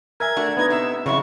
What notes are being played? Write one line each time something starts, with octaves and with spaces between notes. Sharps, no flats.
A#4 E5 G#5 G#6
A3 D4 F#4
B3 D#4 A#5 G#6
C3 E5
F2 C#3 F#3 E4 C#6